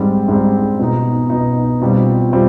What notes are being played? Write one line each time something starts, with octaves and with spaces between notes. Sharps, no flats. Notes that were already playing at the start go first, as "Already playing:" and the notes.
Already playing: G#2 G3 C4
G#2 G3 C4
B2 B3 D#4
B2 B3 D#4
B2 G3 C4 F4
B2 G3 C4 F4